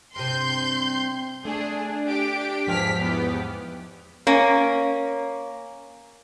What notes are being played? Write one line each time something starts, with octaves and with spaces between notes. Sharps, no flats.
G2 C3 C6 G6
A3 D4 G#4
G4 D7
E2 G#2 F3 G#4 G5 F6 B6
E2 B3 G4
A#3 C#4